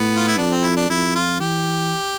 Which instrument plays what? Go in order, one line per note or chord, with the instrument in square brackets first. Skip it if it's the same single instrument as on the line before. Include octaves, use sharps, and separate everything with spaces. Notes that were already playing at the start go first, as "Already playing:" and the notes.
Already playing: [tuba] A2 [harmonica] B3
[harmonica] F4
E4
[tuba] F2 [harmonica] D4
[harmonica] C4
E4
D4
[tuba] F2 [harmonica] E4
[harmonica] F4
[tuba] E3 [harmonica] G4